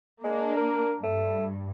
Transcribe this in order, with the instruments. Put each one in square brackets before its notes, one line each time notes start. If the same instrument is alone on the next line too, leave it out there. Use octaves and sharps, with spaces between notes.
[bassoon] G#3 [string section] A#3 D4
[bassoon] A#4
[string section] G2 [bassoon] A3